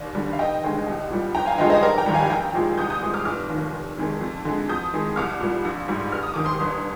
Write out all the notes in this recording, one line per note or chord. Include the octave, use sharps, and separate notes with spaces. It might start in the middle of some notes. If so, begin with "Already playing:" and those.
Already playing: D#2 D5
D3 G3
F5
F1 D#5 G5
D#2 D3 G#3
C2
A#2 G3
G1 G5 A#5
F5 G#5
G2 D3 F3 G#3 D#5 G5
C5 D#5
F1 A#4 D5
G5 A#5
D#2 D#3 G3
F5 G#5
A#1 G5 A#5
A#2 F3 G#3
C2 D#6 G6
D#6 G6
A#2 F3 G#3
D6 F6
F1 D6 F6
D#2 D#3
F1
F2 D#3 G#3
F2
D3 G#3
F2 D#6 G6
D#3 G#3
C2 D6 F6
A#2 G3
A#1
G#2 G3
F1 F6
D#6
D#2 D#3 D6
C6 D#6
G1